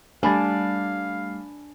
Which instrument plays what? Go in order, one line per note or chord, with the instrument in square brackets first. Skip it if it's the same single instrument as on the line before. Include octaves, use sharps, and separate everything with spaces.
[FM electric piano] G3 A3 [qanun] D4 [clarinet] F5 [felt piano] G#5 B5 A6